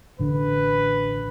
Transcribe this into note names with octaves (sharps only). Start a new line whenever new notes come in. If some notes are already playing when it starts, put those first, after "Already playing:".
A1 D3 B4